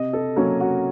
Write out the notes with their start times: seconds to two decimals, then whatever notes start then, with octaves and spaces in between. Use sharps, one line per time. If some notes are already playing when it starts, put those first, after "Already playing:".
Already playing: C3 D#5
0.13 A4
0.36 F#3 A#3 C#4
0.60 F#4